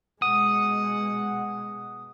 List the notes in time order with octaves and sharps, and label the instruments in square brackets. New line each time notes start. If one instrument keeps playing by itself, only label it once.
[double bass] B2 G#3 [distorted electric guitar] F#5 [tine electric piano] D#6